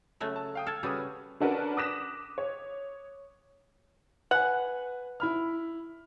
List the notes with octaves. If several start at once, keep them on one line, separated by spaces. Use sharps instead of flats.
C#3 F#3 A3
A5
F5 G5 D#6
A4 F6 G#6
C#3 G3 F#4 B4 D#6
D3 C#4 D4 F#4 A#4 B4
D6 D#6 F#6 A#6 B6 E7
C#5
B4 F#5 G#5
E4 B5 F6